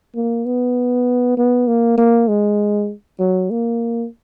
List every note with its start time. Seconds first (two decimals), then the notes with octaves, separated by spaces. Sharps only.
0.15 A#3
0.46 B3
1.38 B3
1.68 A#3
1.98 A#3
2.28 G#3
3.19 F#3
3.51 A#3